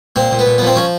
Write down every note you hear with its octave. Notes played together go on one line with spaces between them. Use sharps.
A#2 C4
A#2
B3
A#2
B3
F3 C4
F3 C#4